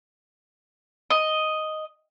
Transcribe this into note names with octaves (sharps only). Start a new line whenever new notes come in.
D#5